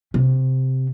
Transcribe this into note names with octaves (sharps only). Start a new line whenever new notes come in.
C3